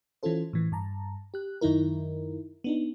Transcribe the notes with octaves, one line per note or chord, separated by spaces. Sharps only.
E3 C#4 E4 F4 A4 C5
A2 E3
G2 A5 A#5
G4 F#6
F#2 D#3 D#4 E4 A#4
B3 D4 D#4